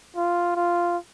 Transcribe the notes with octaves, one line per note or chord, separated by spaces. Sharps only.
F4
F4